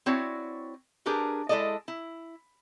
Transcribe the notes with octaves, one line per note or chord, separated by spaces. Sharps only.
C4 E4 F#4 C#5 D5
D4 G4 G#4 A#4 B4
G#3 E4 A4 D5 D#5
E4